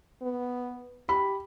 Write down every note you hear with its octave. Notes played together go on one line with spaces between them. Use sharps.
B3
G4 B5